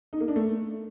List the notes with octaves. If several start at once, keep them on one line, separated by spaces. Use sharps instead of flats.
D#4
A#3
D4
A3